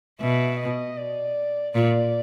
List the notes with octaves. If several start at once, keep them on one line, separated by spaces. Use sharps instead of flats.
B2 E5
D#5
D5
A#2 D5